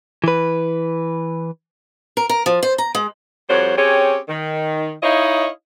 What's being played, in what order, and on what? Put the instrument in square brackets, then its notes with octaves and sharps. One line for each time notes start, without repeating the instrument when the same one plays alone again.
[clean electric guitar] E3 B4
[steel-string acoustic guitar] A#4
A#4
F3
C5
A#5
G#3
[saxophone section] F2 G3 F#4 C5 C#5
C4 C#4 G4 G#4 C#5
D#3
D#4 E4 C#5 D#5 F5